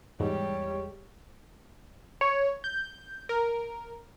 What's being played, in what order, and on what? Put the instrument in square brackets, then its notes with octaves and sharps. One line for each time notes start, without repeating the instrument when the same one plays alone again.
[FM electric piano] E2 G#3 [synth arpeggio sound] G#2 [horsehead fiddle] G3 G4 [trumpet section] C#5
[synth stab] C#5
G6
A#4